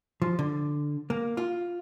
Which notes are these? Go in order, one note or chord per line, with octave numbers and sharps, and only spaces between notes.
F3
D3
A#3
F4